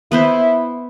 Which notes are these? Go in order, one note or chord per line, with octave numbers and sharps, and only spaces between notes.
B3 E4 B4 C5